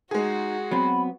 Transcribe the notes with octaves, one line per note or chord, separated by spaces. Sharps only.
G#3 D#4 F#4 G#4
F#3 B3 C4 B5